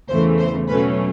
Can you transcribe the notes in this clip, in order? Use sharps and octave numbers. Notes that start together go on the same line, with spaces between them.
E2 C#3 E3 A3 C5
C5
B2 F#3 A3 C#4 B4